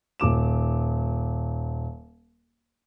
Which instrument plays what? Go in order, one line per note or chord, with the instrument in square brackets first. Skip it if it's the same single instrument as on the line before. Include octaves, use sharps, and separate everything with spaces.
[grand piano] D#1 D6 E7